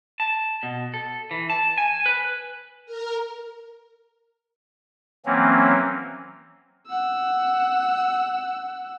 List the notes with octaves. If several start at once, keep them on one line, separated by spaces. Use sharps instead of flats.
A5
B2
A4
E3
A5
G#5
B4
A#4
E3 F#3 A#3 C4 C#4
F#5 E6